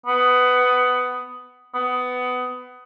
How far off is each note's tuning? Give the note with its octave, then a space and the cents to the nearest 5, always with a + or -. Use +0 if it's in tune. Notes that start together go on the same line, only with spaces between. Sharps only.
B3 +15
B3 +20